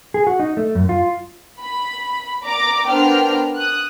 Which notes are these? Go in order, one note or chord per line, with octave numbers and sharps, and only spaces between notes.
G#4
F#4
D#4
A3
F#2
F4
B5
D5 A#5 D6
B3 D4 A#4 C5 G5 F6
D#6 F#6